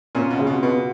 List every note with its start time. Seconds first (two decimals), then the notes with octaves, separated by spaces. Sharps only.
0.15 A#2 C#4
0.30 B2
0.39 C#3
0.47 B2
0.63 B2 B3